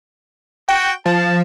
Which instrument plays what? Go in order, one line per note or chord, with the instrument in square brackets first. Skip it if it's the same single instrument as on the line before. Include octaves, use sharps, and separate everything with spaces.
[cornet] F#4 [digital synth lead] G5
[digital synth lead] F3 [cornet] A5